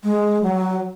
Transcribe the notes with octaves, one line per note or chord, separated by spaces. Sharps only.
G#3
F#3